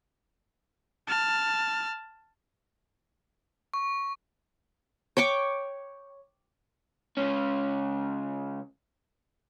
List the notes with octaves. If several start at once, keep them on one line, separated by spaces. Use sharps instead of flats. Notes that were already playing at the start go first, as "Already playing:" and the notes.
A5 F6
C#6
C#5 G5 C#6 D6
C#2 C#4